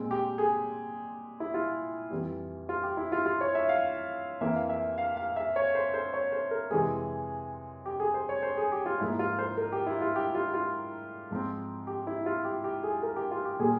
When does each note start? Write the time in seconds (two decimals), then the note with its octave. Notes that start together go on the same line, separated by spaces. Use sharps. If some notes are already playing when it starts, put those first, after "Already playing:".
Already playing: A#2 G#3 C4
0.11 G4
0.38 G#4
1.40 E4
1.54 F4
2.11 F2 E3 G3
2.69 F4
2.83 G4
2.97 E4
3.12 F4
3.26 F4
3.41 C#5
3.55 E5
3.69 F5
4.41 F2 E3 A#3 E5
4.56 F5
4.69 E5
4.98 F5
5.17 F5
5.36 E5
5.56 C#5
5.75 C5
5.94 C5
6.14 C#5
6.32 C5
6.51 A#4
6.71 F2 C3 E3 G#3 C4 G#4
7.86 G4
8.00 G#4
8.14 C5
8.29 C#5
8.43 C5
8.57 G#4
8.72 G4
8.86 F4
9.00 G#2 F3 A#3 E4
9.19 F4
9.39 C5
9.57 A#4
9.72 G4
9.87 E4
10.01 F4
10.16 G4
10.35 F4
10.54 F4
11.31 G#2 F3 C4
11.87 G4
12.07 E4
12.26 F4
12.44 G4
12.64 G4
12.83 G#4
13.03 A#4
13.16 G4
13.31 F4
13.45 G4
13.59 A#2 G3 A#3 G#4